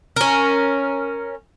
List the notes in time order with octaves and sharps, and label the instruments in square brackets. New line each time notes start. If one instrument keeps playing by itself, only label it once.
[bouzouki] C#4 A#4